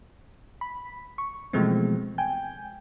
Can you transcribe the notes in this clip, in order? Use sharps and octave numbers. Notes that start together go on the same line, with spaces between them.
B5
C#6
B2 E3 F3 G#3 A3 C4
G5 G#5 G6